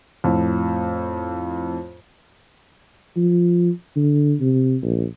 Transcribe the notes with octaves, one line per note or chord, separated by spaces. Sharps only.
F2 A2
F3
D3
C3
A#1